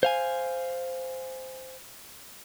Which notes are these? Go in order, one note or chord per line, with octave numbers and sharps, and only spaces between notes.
C5 F5 G#5